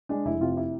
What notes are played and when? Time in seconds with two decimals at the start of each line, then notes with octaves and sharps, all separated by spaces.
0.09 G#3 D4
0.25 F1 E4
0.41 C3 F4
0.57 E4